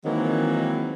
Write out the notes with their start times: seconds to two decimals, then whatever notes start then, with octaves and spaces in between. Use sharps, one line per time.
0.05 D#3 E3 F#3 G#3 A#3 C4